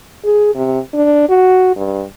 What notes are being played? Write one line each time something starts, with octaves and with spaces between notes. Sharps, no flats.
G#4
C3
D4
F#4
G2